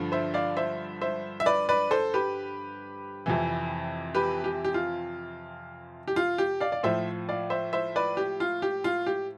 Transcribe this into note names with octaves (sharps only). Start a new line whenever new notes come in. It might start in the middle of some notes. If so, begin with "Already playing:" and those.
Already playing: G2 D3 F3
C5 E5
D5 F5
C5 E5
C5 E5
E5
B4 D5
B4 D5
A4 C5
G4 B4
F2 C3 E3
G4 B4
G4
G4
F4
G4
F4
G4
D5 F5
D5
A2 F3 C5 E5
D5 F5
C5 E5
C5 E5
B4 D5
G4
F4
G4
F4
G4